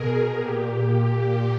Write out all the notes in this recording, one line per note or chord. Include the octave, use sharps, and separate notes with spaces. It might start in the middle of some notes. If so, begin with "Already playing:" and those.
Already playing: B2 G#4 A#4
A#2 G4
G4